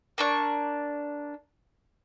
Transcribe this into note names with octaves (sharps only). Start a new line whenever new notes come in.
A#3 D4 C#6